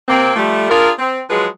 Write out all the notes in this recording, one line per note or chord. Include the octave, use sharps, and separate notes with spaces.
C3 A#3 C4
F3 G3 A3
D4 F4 G#4 A#4
C4
F3 F#3 G#3 G#4 B4